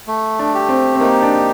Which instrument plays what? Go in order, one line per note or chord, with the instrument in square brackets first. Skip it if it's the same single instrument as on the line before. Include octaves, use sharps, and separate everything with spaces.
[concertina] A3
[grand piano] D4
[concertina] G4
[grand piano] C4
C4
[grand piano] A#3 [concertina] D#4
[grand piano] D4